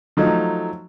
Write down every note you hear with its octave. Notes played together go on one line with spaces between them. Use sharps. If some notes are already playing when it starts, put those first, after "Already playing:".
F3 F#3 A3 D#4